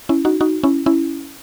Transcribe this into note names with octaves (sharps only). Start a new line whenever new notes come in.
C#4 E4
D#4 F#4
D#4 F#4
C#4 E4
C#4 E4